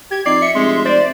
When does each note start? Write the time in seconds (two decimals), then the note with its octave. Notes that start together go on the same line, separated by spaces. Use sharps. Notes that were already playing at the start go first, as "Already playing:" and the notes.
0.11 G4 G#6
0.26 F2 D#4 D5 C7
0.42 E5 C#7
0.55 F1 G#3 C6
0.85 C5 D5